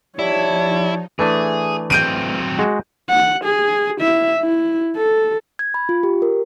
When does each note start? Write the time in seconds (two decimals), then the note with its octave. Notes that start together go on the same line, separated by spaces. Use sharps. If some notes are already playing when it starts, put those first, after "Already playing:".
0.19 F3 G3 D#4 E4 C#5 A5
1.19 E3 A3 D4 G#4
1.90 F#3 C4 G6 D7 D#7
2.59 G#3 F#4
3.10 F#5
3.45 G#4
4.01 E4 E5
4.40 E4
4.97 A4
5.59 G#6
5.74 B5
5.89 F4
6.03 G4
6.22 A#4